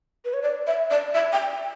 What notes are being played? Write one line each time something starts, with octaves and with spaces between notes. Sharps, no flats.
B4
C#5
D5
E5
D5
E5
G5